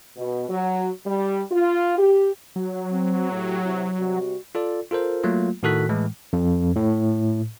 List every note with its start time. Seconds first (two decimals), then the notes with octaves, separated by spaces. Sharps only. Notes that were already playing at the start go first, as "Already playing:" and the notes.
0.17 B2
0.49 F#3
1.05 G3
1.52 F4
1.98 G4
2.56 F#3
2.92 C4
3.32 A2 G4
3.64 C3 E4
3.98 C3 G3 F#4
4.55 F4 A4 D5
4.91 F4 A4 A#4 C5
5.24 F#3 A3 A#3 F4
5.63 A2 D#3 F#4 A4 F#6 B6
5.89 A2 E3 G#3
6.33 F2
6.76 A2